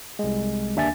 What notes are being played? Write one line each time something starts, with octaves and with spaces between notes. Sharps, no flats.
C2 G#3
G1 D#2 D4 E5 G#5 A6